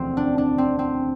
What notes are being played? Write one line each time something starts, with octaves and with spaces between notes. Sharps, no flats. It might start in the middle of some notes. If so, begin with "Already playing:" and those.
Already playing: E1 D2 D3 F3 C4
D4
D4
C4
C4